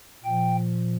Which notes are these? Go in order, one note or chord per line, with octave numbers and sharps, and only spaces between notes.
A#2 F3 G5